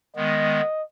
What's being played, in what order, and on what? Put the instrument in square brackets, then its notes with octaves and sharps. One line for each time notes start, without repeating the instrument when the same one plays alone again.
[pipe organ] D#3 G#3 B3 [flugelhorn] D#5